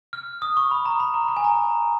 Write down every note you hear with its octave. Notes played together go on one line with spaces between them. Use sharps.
F6
D#6
C#6
B5
A#5
B5
A#5
A#5
G#5
A#5